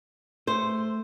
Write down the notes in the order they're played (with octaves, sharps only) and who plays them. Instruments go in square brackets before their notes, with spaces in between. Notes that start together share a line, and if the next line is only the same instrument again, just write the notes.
[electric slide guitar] A3 [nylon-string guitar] C5